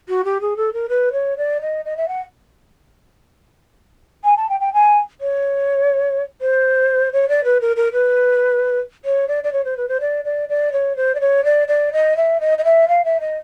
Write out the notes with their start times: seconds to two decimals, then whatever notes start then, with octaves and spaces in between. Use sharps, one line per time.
0.08 F#4
0.24 G4
0.41 G#4
0.57 A4
0.73 A#4
0.89 B4
1.12 C#5
1.37 D5
1.61 D#5
1.85 D#5
1.97 E5
2.08 F#5
4.24 G#5
4.37 A5
4.49 G5
4.60 G5
4.73 G#5
5.21 C#5
6.41 C5
7.12 C#5
7.28 D5
7.44 B4
7.61 A#4
7.76 A#4
7.92 B4
9.05 C#5
9.28 D5
9.43 D5
9.52 C#5
9.64 C5
9.77 B4
9.88 C5
10.00 D5
10.24 D5
10.49 D5
10.72 C#5
10.96 C5
11.15 D5
11.20 C#5
11.44 D5
11.68 D5
11.92 D#5
12.16 E5
12.40 D#5
12.58 D#5
12.64 E5
12.88 F5
13.04 E5
13.20 D#5